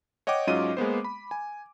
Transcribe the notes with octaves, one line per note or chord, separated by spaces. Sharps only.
C#5 D#5 F#5 G5 D6
G#2 F#3 C#4 F4 D#5 D#7
G#3 A#3 B3 C5
B5
G#5